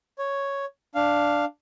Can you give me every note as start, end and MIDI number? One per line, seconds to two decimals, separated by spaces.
0.18 0.65 73
0.95 1.45 62
0.95 1.45 77